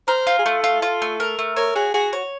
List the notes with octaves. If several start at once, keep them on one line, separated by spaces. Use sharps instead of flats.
A#4 C5
F4
G#4
A3 A4
F4
F4
A3
A#4
A3
A#4 C#5
F#4 G#4
F#4 G#4
C#5